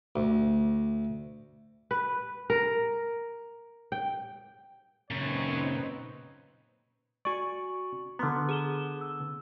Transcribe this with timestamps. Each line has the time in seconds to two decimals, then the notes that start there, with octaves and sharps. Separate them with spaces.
0.16 D2
1.91 B4
2.50 A#4
3.92 G5
5.10 F#2 A#2 C#3 C4 D#4 B4 C#5
7.25 F#4 D5 G#5 C#6
8.19 D3 B3 A#5 C6 F6
8.49 G#4 E7 G7
9.01 E6